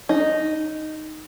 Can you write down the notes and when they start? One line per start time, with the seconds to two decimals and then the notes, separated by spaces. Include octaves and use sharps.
0.09 D#4